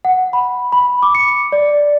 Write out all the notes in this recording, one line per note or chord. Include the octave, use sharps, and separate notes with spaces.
F#5
B5
B5
D6
C#7
D5